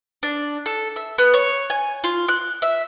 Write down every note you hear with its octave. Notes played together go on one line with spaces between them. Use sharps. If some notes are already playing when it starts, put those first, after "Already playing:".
D4
A4
E5
B3
C#5
G#5
F4
F#6
E5